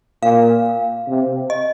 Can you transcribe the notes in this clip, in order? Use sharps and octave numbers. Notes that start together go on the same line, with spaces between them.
A#2 F5
C3
D#5